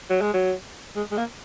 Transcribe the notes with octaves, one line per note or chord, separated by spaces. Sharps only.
F#3
G#3
F#3
G#3
G#3
A#3